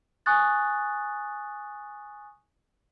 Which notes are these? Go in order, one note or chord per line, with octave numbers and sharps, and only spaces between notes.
G#5 C#6 D#6 F#6 A6